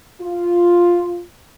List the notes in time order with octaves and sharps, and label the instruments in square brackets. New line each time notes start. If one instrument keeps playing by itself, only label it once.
[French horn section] F4